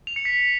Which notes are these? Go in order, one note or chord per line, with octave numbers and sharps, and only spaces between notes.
F7
C#7
B6